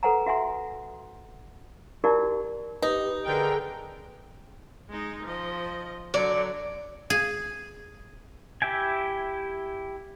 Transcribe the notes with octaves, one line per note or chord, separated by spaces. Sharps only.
A4 B4 C5 F#5 G#5 A#5
F#4 E5 F#5 G#5 C6
D#4 E4 F#4 G4 A#4 D5
D#4 G4 B4
D3 G#4 A#4 G5
G#3 D#4
F3 D#5
D3 F#3 D5
G#4
E4 G4 E5 G5 G#5